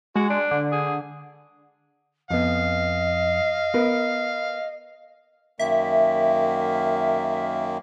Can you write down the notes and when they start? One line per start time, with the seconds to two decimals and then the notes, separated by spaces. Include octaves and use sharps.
0.15 G#3 F#4
0.30 D4
0.51 D3
0.72 G#4
2.30 F2 B3 D#5 F5
3.74 B3 A#4 B4
5.59 F#2 D#3 A#3 E5